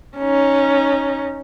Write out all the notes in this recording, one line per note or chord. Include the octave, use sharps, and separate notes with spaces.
C#4 D#4